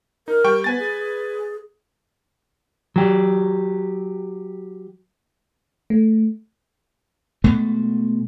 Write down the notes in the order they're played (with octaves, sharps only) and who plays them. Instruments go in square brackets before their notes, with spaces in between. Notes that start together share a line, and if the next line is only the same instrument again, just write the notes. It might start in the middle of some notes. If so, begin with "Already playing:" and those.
[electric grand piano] D#4 [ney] A#4
[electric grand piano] G3 G5 C#6
[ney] B3 [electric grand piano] B4 G#5 A6
[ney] G#4
[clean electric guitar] F#3 G4
[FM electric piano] A3
[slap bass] B2 G#3 A3